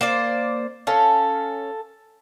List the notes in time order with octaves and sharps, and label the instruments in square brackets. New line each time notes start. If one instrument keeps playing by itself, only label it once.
[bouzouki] A#3 C5 D5
[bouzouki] C#4 [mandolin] A4 F5